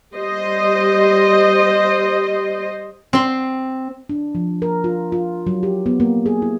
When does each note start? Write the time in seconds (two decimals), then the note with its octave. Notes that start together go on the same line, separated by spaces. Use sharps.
0.14 G3 C5 D#5
3.13 C4 C6
4.09 D4
4.35 F3
4.62 A#4
4.84 F4
5.12 F4
5.47 F#3
5.63 G4
5.86 B3
6.00 A#3
6.26 G#4
6.42 E4